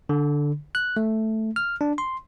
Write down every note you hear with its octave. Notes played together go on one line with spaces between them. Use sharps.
D3
F#6
A3
F6
D4
C6